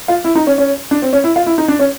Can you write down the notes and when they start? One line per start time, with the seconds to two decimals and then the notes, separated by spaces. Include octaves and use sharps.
0.08 F4
0.24 E4
0.35 D#4
0.47 C#4
0.58 C#4
0.91 D4
1.02 C4
1.13 C#4
1.24 E4
1.36 F4
1.46 E4
1.58 D#4
1.68 D4
1.79 C#4